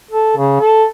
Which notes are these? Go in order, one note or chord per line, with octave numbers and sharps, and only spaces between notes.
A4
C#3
A4